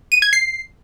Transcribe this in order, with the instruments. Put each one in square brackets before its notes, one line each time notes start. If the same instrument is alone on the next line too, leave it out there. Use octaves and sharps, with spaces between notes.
[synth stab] D#7
G#6
C7